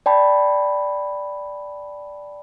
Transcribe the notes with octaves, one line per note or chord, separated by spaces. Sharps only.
D5 G5 A5 B5